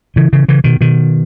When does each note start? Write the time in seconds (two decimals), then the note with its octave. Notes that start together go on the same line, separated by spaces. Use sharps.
0.16 C#3 E3
0.33 C#3 E3
0.48 C#3 E3
0.64 B2 D#3
0.81 B2 D#3